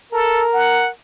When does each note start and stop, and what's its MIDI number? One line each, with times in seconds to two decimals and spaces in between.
0.12 0.47 69
0.12 0.88 70
0.54 0.90 78